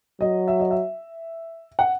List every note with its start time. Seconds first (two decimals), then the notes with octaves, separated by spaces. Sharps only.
0.21 F#3 D#5
0.48 E5
0.60 D#5
0.71 E5
1.79 F#5